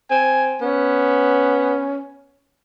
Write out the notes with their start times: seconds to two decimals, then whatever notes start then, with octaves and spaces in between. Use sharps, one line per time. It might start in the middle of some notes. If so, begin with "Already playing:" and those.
0.10 C4 G#5
0.62 B3 C#4